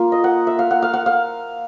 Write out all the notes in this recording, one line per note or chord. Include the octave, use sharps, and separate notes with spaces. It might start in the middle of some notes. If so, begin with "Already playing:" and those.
Already playing: A#3 F4
D#5
F#5
E5
F5
F#5
F5
F#5
F5